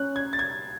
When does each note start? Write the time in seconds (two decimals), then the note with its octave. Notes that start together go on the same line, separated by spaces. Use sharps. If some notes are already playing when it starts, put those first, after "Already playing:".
Already playing: C#4 F#6
0.16 G#6
0.33 A6
0.39 G#6